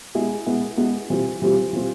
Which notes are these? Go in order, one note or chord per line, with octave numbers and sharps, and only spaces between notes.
G#3 B3 E4 G#4
G#3 B3 E4 G#4
G#3 B3 E4 G#4
E3 G3 C4 F4
E3 G3 C4 F4
E3 G3 C4 F4